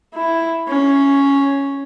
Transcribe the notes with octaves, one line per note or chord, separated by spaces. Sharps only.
E4
C#4